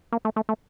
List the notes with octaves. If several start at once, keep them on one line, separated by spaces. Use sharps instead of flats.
A#3
A3
A3
A3